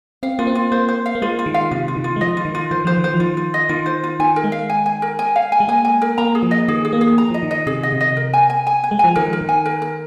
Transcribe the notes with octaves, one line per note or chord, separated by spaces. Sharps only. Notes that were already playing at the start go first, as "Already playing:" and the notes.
C4 F5
A#3 F4
C4
F4
A#3 C5
C5
F5
A#3
G#3 F4
F4
D#3
F5
C3 F4
F4
D#3
F4
G#3
F3 D#5
F4
D#3
F4
D#3 C5
F3 C5
D#3
C5
F3
D#3 F4
F4
D#5
D#3 F4
C5
F4
D#3 G#5
A#4
G#3
F5
G#5
G#5
A#4
G#5
F5
G#5
G#3
A#3 G#5
G#5
A#4
A#3 A#5
G#4
F3
D#5
D#3 G#4
G#4
A#3
G#4
A#5
F3 D#5
D#3
D#5
C3 G#4
D#5
C3
D#5
A#4
G#5
G#5
G#5
G#5
G#3
F3 G#5
D#3 A#4
A#4
D#3
G#5
A#4
A#4